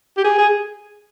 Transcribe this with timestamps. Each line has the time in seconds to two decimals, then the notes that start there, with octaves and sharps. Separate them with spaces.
0.17 G4
0.24 G#4
0.38 G#4